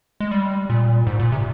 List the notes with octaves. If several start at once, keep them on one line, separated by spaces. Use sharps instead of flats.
G#3
G3
A#2
G#2
A#2
C3